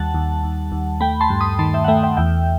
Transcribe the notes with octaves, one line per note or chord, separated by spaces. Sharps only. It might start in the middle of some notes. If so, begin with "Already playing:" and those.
Already playing: D#2 G3 F#5 A5
D#2
D#2
D#2
A3 G5 B5
A5 C6
G2
B5 D#6
D#3 A5 C6
E5 G5
F#5
A3 E5 G5
E5 G5
E2 E5 G5